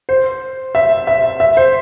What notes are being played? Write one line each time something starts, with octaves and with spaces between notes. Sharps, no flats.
C5
E5
E5
E5
C5